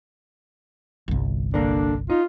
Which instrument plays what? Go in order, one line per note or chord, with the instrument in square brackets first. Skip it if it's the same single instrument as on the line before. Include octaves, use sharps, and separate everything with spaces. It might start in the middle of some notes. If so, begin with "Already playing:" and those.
[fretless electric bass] G1 C2
[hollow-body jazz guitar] D3 A#3 [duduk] D4
[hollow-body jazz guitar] D#4 [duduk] F4